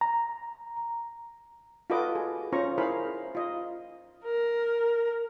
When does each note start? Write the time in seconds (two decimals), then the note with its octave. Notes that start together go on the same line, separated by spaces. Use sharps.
0.01 A#5
1.90 F4 F#4 A4 B4 D#5 D6
2.15 G#4
2.52 C#4 F4 C5 A#5 C#6
2.78 E4 G#4 A#4 C5 F5 B5
3.35 F4 D#5
4.25 A#4